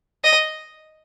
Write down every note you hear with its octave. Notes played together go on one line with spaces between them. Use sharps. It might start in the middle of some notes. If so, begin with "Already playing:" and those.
D#5